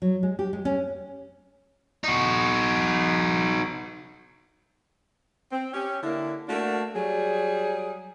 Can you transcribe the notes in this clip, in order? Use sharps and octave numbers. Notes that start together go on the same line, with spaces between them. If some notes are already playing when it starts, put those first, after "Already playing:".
F#3
G#3
G4
G#3
C#4
D#4 F#4
C4
C#4 G4
D3 A#3 E4
A3 A#3 D4 F#4
F#3 G3 G#4